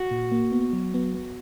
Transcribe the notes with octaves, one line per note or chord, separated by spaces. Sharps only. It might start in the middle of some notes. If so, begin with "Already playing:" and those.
Already playing: F#4
A#2
A#3
B3
F#3
B3
B3